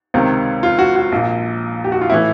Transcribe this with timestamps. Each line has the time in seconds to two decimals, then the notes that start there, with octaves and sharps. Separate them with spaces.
0.14 C#2 C3 D#3
0.63 F4
0.79 F#4
0.96 F#4
1.12 A#1 A#2
1.84 G4
1.92 F#4
2.01 F4
2.10 A2 E3 E4